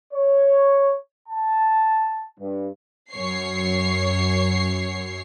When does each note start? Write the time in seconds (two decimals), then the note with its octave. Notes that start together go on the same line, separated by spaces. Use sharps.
0.14 C#5
1.29 A5
2.40 G2
3.12 F#2 C#5 C7